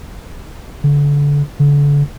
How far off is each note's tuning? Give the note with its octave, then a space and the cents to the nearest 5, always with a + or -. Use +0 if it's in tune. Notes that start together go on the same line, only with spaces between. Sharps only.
D3 -30
D3 -35